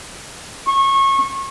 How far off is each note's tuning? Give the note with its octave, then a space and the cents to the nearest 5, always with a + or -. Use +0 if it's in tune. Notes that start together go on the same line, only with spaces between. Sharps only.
C#6 -25